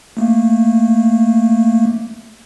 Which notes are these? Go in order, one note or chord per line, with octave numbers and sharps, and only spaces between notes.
A3 A#3